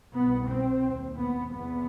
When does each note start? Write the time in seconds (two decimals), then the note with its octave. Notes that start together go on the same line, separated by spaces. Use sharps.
0.12 C2 B2 B3
0.47 C4
0.84 D#2
1.18 B3
1.54 E2 C3 B3